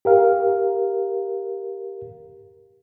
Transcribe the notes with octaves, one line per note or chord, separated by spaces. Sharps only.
G4 A#4 F5